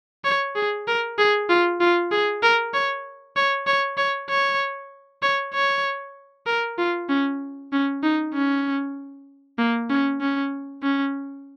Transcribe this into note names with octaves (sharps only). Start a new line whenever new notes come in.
C#5
G#4
A#4
G#4
F4
F4
G#4
A#4
C#5
C#5
C#5
C#5
C#5
C#5
C#5
A#4
F4
C#4
C#4
D#4
C#4
A#3
C#4
C#4
C#4